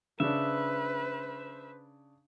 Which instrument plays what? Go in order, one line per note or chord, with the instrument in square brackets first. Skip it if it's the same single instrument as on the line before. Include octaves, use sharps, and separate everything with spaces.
[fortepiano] C#3 D4 [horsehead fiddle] B4 C5 [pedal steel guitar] E5